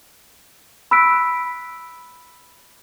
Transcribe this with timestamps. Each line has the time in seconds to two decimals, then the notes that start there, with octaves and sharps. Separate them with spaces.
0.91 B5 E6 F#6 B6 D7